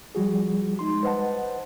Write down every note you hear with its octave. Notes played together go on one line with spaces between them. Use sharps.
F3 G3 F#4 G#4
G#3 D#4 C6
B4 C5 D#5 F#5 A5